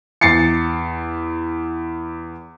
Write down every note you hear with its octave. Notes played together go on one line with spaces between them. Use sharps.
E2 A6 C7 C#7